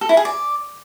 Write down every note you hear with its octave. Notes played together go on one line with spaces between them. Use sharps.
A4
E4
G#4
D5